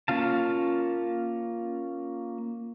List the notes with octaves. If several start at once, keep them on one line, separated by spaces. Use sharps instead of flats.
A#3 C#4 F4 F5 A5